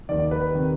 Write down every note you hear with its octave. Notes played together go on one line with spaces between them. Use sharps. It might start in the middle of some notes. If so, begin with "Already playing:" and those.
D#2 D#3 D5
B4
C3 D#3